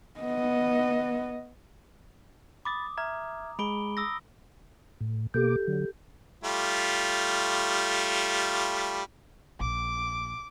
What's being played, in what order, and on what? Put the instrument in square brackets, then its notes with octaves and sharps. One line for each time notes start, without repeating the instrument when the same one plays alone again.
[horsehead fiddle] B3 D#5
[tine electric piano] B5 A6 [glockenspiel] D6 D#6
[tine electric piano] E5 F6 G#6 [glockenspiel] A#5
[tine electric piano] G#3 G#4 [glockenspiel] B5 D7 G7
[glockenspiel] D#6 E6 A#6
[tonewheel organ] A2
[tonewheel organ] B2 A#3 D6 [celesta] G4 A4 G6
[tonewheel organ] D3 F#3
[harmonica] G3 A3 F4
[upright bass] A#1 [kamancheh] D6